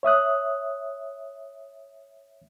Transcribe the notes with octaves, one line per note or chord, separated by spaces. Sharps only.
C#5 E5 D#6 F#6